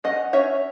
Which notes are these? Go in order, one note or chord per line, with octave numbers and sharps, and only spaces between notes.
C#4 D#5 F#5
C#4 C#5 E5